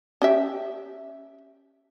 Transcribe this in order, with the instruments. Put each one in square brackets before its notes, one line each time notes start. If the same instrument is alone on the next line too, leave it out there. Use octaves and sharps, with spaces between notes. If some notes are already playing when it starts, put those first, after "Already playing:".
[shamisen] C#4 G4 E5